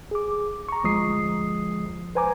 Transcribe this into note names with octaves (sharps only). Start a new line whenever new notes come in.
G#4 D6
A#5 C#6
G1 D2 F3 G#3 D#6 C7
B4 C5 G#5 A#5 D6